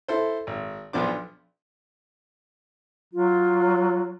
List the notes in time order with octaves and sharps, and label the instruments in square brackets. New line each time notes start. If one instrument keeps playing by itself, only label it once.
[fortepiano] E4 A4 C5
G#1
B1 F3 B3 D4 D6
[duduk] F#3 [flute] F4